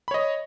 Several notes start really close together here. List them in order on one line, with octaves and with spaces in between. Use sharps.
B5 C#5 D#5